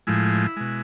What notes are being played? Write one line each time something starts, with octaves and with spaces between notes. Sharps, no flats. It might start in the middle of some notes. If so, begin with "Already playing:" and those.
A2 F3 G#3 E4
B2 G#3